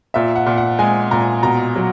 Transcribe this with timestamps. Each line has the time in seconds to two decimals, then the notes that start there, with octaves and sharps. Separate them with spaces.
0.14 A#2 E5
0.36 F#5
0.46 A#2
0.58 F#5
0.79 G#3 G#5
1.11 A#2 A#5
1.43 B2 A#5
1.76 F#3